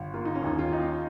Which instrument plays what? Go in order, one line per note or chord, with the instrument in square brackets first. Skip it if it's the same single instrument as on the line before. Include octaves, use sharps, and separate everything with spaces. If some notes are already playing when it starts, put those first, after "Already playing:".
Already playing: [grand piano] G1
[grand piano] A#3 [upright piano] F4
[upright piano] D#4
C#4
[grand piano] D#2 [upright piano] D#4
[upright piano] F4
[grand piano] D#4